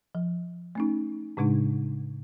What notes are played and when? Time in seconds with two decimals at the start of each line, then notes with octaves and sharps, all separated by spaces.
0.15 F3
0.75 A3 C#4 D#4
1.37 A2 C#3 G#3 D4 D#4